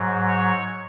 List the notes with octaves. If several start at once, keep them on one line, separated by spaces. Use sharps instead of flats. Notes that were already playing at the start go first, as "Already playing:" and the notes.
Already playing: G#2 F#3
C#5